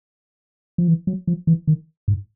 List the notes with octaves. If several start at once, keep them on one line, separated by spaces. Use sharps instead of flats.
F3
E3
F#3
F3
E3
D#3
G#2